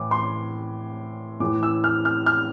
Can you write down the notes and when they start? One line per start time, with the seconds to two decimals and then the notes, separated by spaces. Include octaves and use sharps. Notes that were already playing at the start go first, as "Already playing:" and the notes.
Already playing: A2 E3 D6
0.11 C6
1.40 A2 E3 D6
1.63 E6
1.84 F6
2.05 F6
2.26 F6